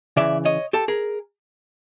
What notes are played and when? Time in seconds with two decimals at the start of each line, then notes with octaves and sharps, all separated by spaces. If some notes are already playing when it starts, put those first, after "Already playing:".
0.17 C#3 E3 D5 E5
0.45 C#5 D#5
0.73 G4 A4
0.88 G#4 A#4